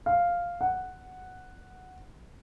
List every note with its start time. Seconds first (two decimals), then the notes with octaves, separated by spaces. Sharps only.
0.06 F5
0.61 F#5